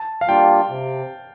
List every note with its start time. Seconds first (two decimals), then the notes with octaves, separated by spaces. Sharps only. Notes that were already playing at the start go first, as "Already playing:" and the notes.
Already playing: A5
0.21 F5
0.28 G3 A#3 D4 F4 G5
0.69 C3